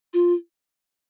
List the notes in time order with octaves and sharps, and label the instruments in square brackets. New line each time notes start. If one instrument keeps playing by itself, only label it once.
[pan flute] F4